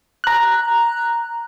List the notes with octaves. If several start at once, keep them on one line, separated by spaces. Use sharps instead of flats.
A#5 F#6